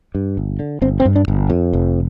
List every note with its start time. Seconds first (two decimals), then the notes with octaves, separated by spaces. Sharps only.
0.15 G2
0.37 G1
0.59 D3
0.82 G1 C4
1.00 C4
1.05 G2
1.16 D4
1.28 G1
1.50 F2
1.73 F1